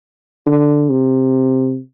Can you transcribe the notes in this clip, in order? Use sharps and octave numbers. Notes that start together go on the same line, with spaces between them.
D3
C3